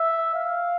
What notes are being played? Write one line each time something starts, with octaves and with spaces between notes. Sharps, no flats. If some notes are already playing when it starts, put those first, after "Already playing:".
Already playing: E5
F5